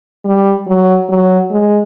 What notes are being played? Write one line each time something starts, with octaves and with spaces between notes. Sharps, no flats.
G3
F#3
F#3
G#3